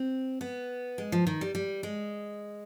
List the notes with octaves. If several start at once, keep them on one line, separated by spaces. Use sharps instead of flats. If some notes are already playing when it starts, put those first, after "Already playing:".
Already playing: C4
B3
G#3
F3
D#3
G3
G3
G#3